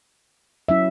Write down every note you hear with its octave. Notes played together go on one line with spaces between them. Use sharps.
F#3 C#4 E4 E5